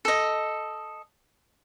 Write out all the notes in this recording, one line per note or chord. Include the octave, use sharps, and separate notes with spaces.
A4 D#5